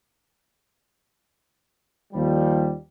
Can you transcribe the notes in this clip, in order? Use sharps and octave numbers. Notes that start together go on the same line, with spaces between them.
D#2 F3 G3